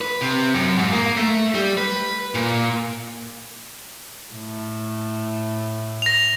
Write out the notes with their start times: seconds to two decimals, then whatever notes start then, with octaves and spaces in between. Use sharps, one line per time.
0.01 B4
0.21 C3
0.54 F#2
0.79 G#2
0.92 A#3
1.17 A3
1.55 G3
1.77 B4
2.35 A#2
4.35 A2
6.02 A#6 F7